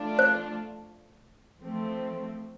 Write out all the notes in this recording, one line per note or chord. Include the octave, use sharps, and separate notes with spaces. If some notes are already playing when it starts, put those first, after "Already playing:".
Already playing: F3 A3 D4 F4
C5
F3 A3 C4